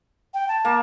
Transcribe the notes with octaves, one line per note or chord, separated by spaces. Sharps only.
G5
A5
A#3